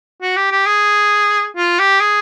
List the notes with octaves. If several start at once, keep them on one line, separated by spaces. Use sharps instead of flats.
F#4
G4
G4
G#4
F4
G4
G#4